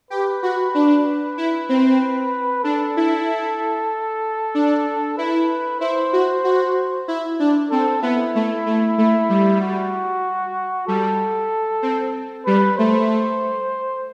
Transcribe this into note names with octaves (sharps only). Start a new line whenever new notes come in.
G4 B4
F#4
D4
E4
C4
D4 A4
E4
D4
E4 B4
E4 C5
F#4
F#4
E4
D4
C4 A4
B3 E4
A3
A3
A3
G3
F#4
G3 A4
C4
G3 B4
A3 C5